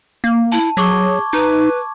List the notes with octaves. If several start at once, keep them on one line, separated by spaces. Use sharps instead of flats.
A#3
E4 A5
F#3 G#4 C#6 D6 G#6
D#4 B4